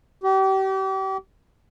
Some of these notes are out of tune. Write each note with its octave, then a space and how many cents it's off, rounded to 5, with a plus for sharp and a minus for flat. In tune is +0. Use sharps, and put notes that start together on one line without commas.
G4 -35